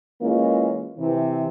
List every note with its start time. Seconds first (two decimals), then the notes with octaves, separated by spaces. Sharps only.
0.21 E3 G#3 A#3 C#4 F4
0.97 C3 E3